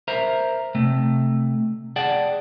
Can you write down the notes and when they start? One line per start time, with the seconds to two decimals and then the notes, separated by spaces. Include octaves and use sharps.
0.08 A#4 C5 E5 A#5
0.75 C3 A3
1.96 G#4 D5 F#5 G5 A5